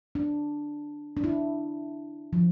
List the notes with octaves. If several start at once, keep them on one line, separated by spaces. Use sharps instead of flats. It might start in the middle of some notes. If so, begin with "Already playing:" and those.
D4
D4
E4
F3